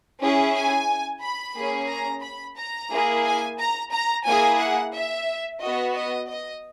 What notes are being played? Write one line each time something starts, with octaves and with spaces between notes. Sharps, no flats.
C#4 E4 G#4
G#5
B5
A#3 C#4 G#4
A#5
B5
A#5
A#3 E4 G#4
G#5
A#5
A#5
A#3 E4 G#4 G#5
F#5
E5
B3 F#4 D#5
D#5
D#5